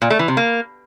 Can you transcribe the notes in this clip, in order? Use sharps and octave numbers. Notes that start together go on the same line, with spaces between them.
A#2
A3
E3
C3
A#3